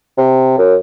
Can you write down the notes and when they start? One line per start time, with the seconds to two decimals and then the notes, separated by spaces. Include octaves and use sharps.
0.18 C3
0.58 F#2